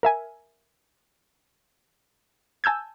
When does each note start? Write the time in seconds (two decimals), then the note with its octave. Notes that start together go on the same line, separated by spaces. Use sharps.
0.03 A#4 E5 G#5
2.64 G#5 A5 E6 G6 G#6